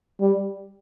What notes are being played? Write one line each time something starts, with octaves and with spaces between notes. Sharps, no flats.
G3